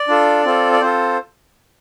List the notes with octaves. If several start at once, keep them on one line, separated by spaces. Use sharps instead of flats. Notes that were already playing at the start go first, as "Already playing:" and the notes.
Already playing: D5
D4 F4 A4
C4 F4 A4
D5
C4 F4 A4 C5